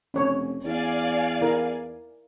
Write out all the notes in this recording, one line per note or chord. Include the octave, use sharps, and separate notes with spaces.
F1 C#4 C#5
E2 D5 F5 G#5
E4 A#4